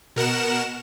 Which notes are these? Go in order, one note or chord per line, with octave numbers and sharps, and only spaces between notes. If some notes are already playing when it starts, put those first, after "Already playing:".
B2 A#4 F#5 E7